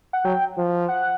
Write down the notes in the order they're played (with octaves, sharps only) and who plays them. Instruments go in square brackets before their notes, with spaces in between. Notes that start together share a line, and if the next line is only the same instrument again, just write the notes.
[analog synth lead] F#5
[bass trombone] F#3 [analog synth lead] G5
[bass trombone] F3
[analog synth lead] F#5